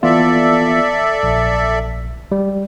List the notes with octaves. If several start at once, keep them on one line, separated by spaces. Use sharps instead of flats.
E3 B3 F4 A4 D5 E5
A#1
G3